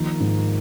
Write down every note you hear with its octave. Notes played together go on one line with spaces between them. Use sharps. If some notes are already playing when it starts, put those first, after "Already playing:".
Already playing: D#3 F3 A#3
G#2